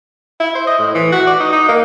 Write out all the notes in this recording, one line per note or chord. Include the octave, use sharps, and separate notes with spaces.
E4
C5
D#5
A2
E3
F#4
D5
D#4
D#4
A#3